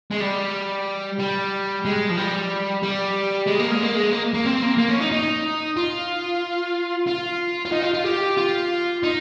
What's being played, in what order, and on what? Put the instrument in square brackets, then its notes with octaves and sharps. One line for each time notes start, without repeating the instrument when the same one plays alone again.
[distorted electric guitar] G#3
G3
G3
G#3
F3
G3
G3
G#3
A#3
G#3
A#3
G#3
A#3
A#3
C4
A#3
A#3
C#4
D#4
D#4
F4
F4
F4
D#4
F4
F4
G4
F4
D#4